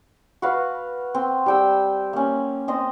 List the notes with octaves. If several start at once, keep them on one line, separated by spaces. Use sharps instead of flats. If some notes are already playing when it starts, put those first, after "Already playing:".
F#4 B4 F5
C4
G3 G5 E6
A#3 C#4
C4 D#5 C6